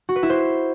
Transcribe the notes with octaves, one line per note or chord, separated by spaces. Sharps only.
F#4
B4
E4
C5